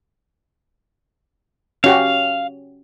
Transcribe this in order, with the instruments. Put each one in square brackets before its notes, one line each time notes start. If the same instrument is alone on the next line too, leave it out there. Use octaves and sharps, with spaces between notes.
[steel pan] C#4 F#4 G4 [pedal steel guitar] F5